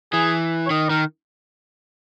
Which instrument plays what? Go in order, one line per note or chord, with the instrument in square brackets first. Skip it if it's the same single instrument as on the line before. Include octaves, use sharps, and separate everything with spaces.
[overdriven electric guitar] E3 [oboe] G#4
[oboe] C#5
[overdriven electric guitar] D#3 [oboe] D#5
[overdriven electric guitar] D#3 [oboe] A#4